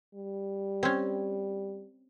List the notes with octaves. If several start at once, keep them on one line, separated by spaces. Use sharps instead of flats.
G3
C4 C#4